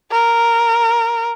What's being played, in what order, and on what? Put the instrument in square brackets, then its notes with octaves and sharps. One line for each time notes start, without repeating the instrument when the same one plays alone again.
[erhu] A#4